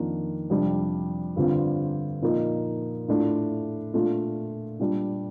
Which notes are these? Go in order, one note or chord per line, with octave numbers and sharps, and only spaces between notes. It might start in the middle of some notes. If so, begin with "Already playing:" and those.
Already playing: F2 D#3 A#3 D4 F4
F2 C3 G3 D4
G2 D3 F3 C4 F4
A#2 F3 A#3 D#4
A2 A3 D4 F4
A#2 A3 D4 F4
A#2 G3 D4